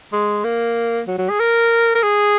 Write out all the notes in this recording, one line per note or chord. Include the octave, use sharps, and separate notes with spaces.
G#3
A#3
F#3
F#3
G#4
A#4
A#4
G#4